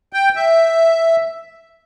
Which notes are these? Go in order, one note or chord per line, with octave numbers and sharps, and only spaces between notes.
G5
E5